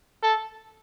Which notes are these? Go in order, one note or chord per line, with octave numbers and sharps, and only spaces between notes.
A4